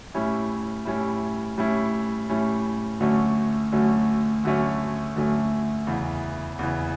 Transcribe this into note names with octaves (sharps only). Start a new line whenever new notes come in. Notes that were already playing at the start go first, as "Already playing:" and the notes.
A2 G3 C#4 E4
A2 G3 C#4 E4
A2 G3 C#4 E4
A2 G3 C#4 E4
D2 D3 F#3 A3 C#4
D2 D3 F#3 A3 C#4
D2 D3 F#3 A3 C#4
D2 D3 F#3 A3 C#4
E2 C#3 E3
E2 C#3 E3